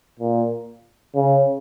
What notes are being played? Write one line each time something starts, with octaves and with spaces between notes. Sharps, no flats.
A#2
C#3